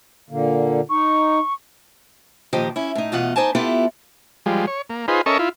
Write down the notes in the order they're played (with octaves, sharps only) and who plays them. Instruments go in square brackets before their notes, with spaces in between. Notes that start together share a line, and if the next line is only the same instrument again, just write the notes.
[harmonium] A#2 D3 A#3
[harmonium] D#4 [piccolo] C#6
[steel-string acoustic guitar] A#2 D#3 F3 G4 C5 D#5
C#4 E4
A2 D#4
E2 B2 F4 D#5 F#5
D#4 C5 D5 G#5 A5
B3 E4 F4 G4 A4
[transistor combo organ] F3 G3 G#3
C#5
A#3
D#4 F4 G#4 B4 C5
C#4 A4 A#4 D#5 E5 C#6
E4 F4